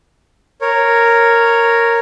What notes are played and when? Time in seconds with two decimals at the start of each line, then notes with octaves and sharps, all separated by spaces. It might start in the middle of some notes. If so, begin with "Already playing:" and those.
0.61 A#4 C#5